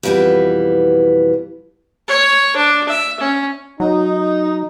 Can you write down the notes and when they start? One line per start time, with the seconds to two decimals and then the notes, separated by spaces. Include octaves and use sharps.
0.03 F2 B2 E3 G3 B3
2.08 C#5
2.56 D4
2.89 E5
3.20 C#4
3.80 F#3 D#4